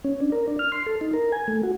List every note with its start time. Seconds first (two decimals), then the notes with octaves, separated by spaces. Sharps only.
0.04 C#4
0.20 D4
0.32 A#4
0.48 D4
0.59 F6
0.72 C6
0.86 A4
1.01 D#4
1.13 A#4
1.32 G#5
1.48 A3
1.63 F#4